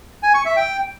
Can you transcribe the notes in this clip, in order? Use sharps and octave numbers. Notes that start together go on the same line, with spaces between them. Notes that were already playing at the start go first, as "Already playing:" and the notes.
G#5
C#6
E5
G5